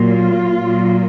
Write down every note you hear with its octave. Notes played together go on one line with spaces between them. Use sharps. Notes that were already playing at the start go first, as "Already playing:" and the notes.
Already playing: A#2 F#3 A#3 F4
A#2 F#3 A#3